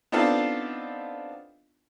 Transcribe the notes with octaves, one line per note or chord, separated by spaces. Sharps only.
B3 C4 D4 D#4 F4 A4